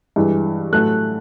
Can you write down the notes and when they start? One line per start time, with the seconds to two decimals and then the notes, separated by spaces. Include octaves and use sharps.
0.16 G2 E3 G#3
0.73 A2 F#3 A3 F#6